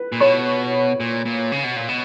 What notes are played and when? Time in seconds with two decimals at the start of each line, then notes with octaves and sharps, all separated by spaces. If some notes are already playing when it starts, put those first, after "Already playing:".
Already playing: B4
0.12 A#2
0.20 B2 C#5
1.00 A#2
1.26 A#2
1.52 C#3
1.64 B2
1.76 A#2
1.89 B2